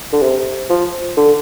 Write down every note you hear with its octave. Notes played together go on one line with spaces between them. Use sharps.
D3
C3
F3
D3